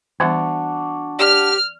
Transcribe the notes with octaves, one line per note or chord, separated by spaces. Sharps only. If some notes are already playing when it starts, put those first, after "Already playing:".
E3 G3 B3 D4 F#4
G4 D5 F6